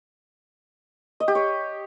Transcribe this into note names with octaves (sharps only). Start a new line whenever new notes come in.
D#5
G4
C#5